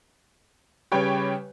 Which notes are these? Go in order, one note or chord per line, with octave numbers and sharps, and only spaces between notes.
C#3 G3 G4 B4 C#5 G5